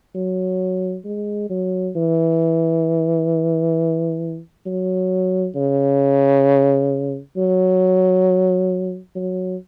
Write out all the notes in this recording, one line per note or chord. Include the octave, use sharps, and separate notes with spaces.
F#3
G#3
F#3
E3
F#3
C#3
F#3
F#3